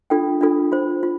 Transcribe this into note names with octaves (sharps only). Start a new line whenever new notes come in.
D4 F4 A4 G5
D4 F4 A4
F4 C5
F4